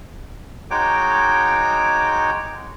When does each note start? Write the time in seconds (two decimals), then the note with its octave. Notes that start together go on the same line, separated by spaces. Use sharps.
0.71 G#3 D#4 F#4 C#5 G5 D6